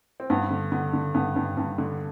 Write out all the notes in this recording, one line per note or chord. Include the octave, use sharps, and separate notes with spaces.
C4
G2 B3
D3
D3 B3
D3
G2 B3
G2
G2
D3